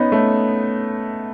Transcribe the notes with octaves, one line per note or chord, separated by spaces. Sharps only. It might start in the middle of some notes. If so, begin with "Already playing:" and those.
Already playing: B3 C#4 D#4
A3 C#4